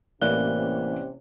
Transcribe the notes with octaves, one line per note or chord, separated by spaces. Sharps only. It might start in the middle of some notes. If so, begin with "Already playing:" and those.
A1 C3 E3 A#3 C#4 D5 F#6 G7